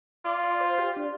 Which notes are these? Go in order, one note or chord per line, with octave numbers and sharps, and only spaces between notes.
F4 D5
D5
C5
G4
D4